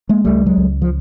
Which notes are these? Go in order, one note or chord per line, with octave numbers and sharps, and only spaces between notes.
G#3 A#3
C#2 G3 A3
F#3 G#3
C#2
F3